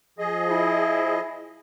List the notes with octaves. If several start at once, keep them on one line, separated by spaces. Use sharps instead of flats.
F3 G#4 D#5
E4